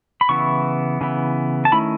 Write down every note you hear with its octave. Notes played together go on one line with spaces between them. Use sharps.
B5
C#3 E3 B3 E4 C#6
C#3 E3 B3 E4
A5
D#3 A3 C#4 E4 B5